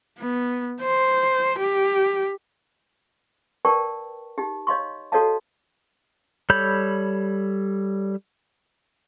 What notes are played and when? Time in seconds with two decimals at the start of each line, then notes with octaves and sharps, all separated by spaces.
0.19 B3
0.81 C5
1.58 G4
3.65 A#4 B4 D5 G5 A5 C#6
4.38 D#4 G4
4.67 C#5 D#5 F5 C6 C#6
5.12 F#4 A4 C#5 D#5 F5 A5
6.50 G3 A4 C#5 B5 G6